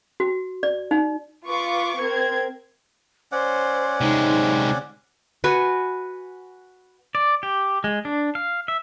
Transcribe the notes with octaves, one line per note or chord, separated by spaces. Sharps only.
F#4
D5
D#4
F4 B4 C#6 D6
C4 A#4 G#6
C#4 C5 D5 F#5
C3 G#3 D#4 C5
F#4 B4 G#5
D5
G4
G#3
D4
F5
E5